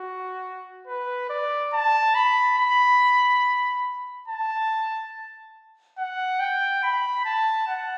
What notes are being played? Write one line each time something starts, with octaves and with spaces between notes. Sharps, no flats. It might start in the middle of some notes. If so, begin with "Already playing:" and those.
Already playing: F#4
B4
D5
A5
B5
B5
A5
F#5
G5
B5
A5
F#5